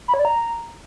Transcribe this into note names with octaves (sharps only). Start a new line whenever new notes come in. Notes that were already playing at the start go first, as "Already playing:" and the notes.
B5
C#5
D5
A#5